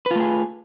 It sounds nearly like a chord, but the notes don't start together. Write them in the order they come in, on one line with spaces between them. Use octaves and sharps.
B4 F4 A3 G#4